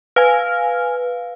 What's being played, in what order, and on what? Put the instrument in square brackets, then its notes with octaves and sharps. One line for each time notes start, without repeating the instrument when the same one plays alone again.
[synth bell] B4 F5 [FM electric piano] G#5 F6